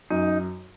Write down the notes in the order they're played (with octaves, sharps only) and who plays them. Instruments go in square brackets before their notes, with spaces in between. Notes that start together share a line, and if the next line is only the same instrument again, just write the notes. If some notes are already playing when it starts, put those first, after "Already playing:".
[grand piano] F#2 [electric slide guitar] D#4